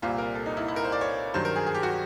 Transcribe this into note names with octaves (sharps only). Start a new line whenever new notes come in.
C2 A#2 G3 C4 F4
A#4
A4
D#4
E4
E4
A#4
C5
D5
C#5
G2 D#3 F#3 C5
A#4
G#4
G#4
G4
F#4